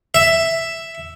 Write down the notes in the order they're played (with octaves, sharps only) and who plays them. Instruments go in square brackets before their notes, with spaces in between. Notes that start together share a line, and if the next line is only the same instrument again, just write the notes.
[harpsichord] E5